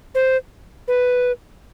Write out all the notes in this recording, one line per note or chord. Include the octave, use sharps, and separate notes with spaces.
C5
B4